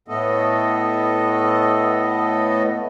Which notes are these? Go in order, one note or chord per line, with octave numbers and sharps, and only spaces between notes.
A2 A3 B3 A4 D#5